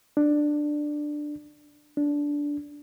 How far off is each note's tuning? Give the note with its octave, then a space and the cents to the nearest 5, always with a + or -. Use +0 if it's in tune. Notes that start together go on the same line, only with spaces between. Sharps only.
D4 +10
D4 -15